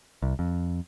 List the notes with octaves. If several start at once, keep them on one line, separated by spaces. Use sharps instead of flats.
C2
F2